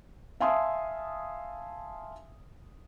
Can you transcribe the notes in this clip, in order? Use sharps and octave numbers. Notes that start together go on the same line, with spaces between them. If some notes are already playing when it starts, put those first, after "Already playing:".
E5 F5 G#5 A5 C6 D#6